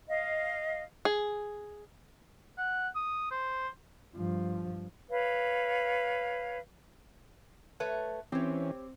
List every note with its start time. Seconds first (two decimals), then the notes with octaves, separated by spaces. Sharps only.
0.08 D#5 F5
1.05 G#4
2.58 F#5
2.95 D#6
3.31 C5
4.15 G2 F3
5.10 B4 C#5 F5
7.80 A3 B4 C#5
8.32 E3 C4 C#4 G4 C#5